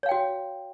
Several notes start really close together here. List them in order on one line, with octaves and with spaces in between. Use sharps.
C#5 F5 G5 F#4